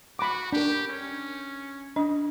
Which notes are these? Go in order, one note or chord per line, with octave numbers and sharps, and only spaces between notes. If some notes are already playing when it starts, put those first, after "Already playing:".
F#4 B5 D6
D4 G4 A#4
C#4
D4 D#5